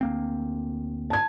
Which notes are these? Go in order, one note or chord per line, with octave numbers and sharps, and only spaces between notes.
D2 A#3 C4
A5 G#6